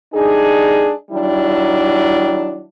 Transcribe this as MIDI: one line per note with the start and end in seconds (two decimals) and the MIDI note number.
0.15 0.92 55
0.15 0.92 62
0.15 0.92 63
0.15 0.92 68
1.12 2.63 51
1.12 2.63 54
1.12 2.63 55
1.12 2.63 62
1.12 2.63 64